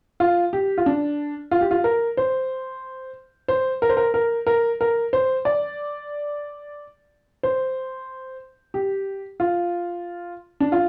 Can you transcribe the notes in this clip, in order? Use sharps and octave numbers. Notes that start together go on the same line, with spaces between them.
F4
G4
F4
D4
F4
G4
F4
A#4
C5
C5
A#4
C5
A#4
A#4
A#4
A#4
C5
D5
C5
G4
F4
D4
F4